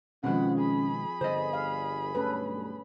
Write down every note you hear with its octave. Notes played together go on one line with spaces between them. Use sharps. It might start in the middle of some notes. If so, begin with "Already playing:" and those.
B2 D#3 F3 G#3 C4 C#4 F#5 B5
G#4 B5
G1 D3 C5 D#5
F5
B1 G2 A3 C#4 A4 B4